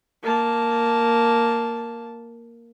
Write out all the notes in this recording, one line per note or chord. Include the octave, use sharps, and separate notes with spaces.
A#3 A5